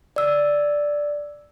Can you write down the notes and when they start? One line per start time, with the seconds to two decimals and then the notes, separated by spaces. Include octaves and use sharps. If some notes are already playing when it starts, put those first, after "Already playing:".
0.16 D5 E6